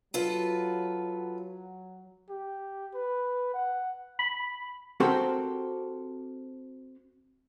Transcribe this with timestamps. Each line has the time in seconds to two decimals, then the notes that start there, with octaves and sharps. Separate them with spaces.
0.14 F#3 F4 A4 B4
2.30 G4
2.95 B4
3.54 F#5
4.19 B5
5.00 C4 F#4 G4 A4 A#4 C5